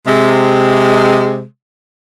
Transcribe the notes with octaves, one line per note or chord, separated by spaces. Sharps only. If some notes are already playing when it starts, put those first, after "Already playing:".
C3 G#3